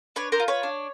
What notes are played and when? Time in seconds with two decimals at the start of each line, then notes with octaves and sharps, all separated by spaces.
0.16 D4 B4 C#5
0.32 A#4 C5
0.40 F4
0.48 B4 C#5
0.63 D4